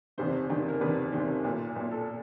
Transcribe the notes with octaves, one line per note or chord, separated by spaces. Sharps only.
F#1 E2 C3 D#3 C5
F#1 E2 C3 D#3
A#4
F#1 E2 C3 D#3 B4
F#1 E2 C3 D#3
B1 A#2
B1 A#2
A4